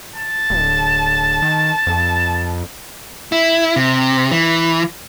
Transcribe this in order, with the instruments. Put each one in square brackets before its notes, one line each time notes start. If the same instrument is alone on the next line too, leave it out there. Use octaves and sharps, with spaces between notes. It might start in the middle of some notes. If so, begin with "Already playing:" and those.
[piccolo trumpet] A5
[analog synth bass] D1
D#3
F2
[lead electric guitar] E4
C3
E3